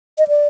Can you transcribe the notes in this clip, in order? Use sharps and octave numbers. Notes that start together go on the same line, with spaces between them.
D#5
D5